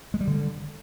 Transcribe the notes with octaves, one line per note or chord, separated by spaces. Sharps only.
G#3
G3
D3